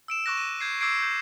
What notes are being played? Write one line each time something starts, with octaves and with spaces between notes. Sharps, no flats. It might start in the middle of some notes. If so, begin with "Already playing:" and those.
E6 D7 E7
C#6 D6 F#6 A#6
D#7
G6 G#6 C7
D6 E6 G6 G#6 C7 D7
G6